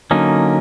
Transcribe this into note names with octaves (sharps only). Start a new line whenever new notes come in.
D3 F#3 A#3 C#4 D#4